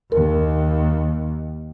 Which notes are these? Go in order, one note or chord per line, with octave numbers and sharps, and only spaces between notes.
D#2 A#4